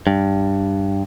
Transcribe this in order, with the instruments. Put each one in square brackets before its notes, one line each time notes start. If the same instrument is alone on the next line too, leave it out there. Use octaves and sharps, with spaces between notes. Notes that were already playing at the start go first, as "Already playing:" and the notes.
[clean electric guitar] G2